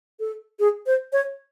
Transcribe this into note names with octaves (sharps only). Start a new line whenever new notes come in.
A4
G#4
C5
C#5